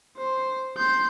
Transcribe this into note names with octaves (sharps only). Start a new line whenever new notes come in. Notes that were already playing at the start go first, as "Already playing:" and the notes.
C5
C6 G6